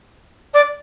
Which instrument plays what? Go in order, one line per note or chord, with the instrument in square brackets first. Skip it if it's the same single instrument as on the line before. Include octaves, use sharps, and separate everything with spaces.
[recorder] D5